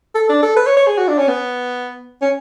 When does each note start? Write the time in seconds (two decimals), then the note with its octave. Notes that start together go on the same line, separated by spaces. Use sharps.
0.15 A4
0.29 D4
0.43 A4
0.56 B4
0.66 C#5
0.77 C#5
0.87 G#4
0.98 F#4
1.08 D4
1.18 C#4
1.28 B3
2.22 C#4